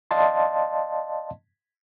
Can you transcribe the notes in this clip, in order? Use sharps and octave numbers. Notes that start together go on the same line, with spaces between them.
D5 D#5 F5 A5 C6